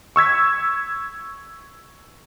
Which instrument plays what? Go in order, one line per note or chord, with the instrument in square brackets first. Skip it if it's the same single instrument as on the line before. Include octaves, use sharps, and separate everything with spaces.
[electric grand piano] C#6 E6 G#6 B6